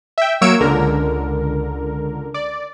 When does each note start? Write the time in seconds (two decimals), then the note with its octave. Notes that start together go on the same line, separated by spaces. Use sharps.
0.18 E5 G5
0.41 F#3 A#3 C#5 E6 D7
0.60 C#2 D3 A#4
2.34 D5